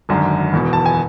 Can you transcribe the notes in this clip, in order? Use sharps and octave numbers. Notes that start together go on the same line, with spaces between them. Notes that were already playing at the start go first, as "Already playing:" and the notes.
G#1 F#2 D3
E1 E2 B2
A5
G#5